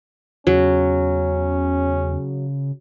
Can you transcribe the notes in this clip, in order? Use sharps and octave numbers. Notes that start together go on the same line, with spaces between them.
E2 C#3 F#3 C#4